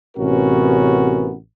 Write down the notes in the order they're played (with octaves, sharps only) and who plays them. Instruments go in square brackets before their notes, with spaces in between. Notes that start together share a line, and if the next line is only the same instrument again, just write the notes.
[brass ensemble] A1 C3 B3 C#4 F#4 A#4